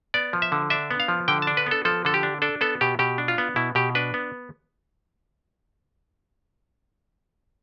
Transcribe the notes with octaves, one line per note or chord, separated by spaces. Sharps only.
B3 D5
F3
E5
D3
D4 E5
B3
F5
F3
D3 G5
A5
D4
B4
B3 A4
F3 A4
D3 A4
G4
D4
D4 A4
B3 A4
B2 G4
B2 G4
D4
F4
B3
B2 E4
B2 G4
D4 B4
B3